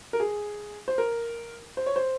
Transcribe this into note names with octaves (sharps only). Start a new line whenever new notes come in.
A#4
G#4
C5
A#4
C5
C#5
C5